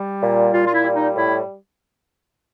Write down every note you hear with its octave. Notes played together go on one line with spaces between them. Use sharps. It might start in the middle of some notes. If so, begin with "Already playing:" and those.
Already playing: G3
A#2
A#2 F4
F4
E4
G3
D#4
A2 E4